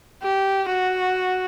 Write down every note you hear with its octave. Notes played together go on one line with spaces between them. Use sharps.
G4
F#4